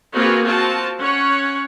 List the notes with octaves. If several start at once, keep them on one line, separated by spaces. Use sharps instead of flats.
A#3 C4 F4 F#4 G#4 B4
C4 F4 F#4 A5
C#4 C#5 F#5